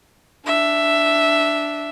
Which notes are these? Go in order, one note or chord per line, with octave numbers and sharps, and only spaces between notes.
D4 E5